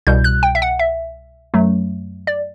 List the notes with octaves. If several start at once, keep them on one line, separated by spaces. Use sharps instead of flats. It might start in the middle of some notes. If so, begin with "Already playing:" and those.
C2 B2 G3 G6
F#6
G5
E5
F#5
E5
F#2 F#3 A3
D5